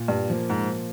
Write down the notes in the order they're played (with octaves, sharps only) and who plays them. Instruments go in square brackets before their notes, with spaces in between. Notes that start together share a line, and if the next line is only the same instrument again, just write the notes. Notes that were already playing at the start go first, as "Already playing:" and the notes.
Already playing: [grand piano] A#2
[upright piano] G2
[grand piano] F3 A#3
[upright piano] G#2